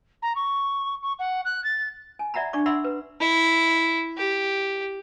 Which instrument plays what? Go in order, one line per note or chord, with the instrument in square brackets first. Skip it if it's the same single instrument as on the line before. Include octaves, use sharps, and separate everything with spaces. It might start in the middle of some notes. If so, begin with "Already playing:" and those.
[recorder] A#5
C#6
C#6
F#5
F#6
A6
[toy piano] G#5
D5 E5 F#5 A#5 B5
D4 D5 C#6 D6
D5 E5 F#5 B5 C6 E6
B4
[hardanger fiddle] E4
G4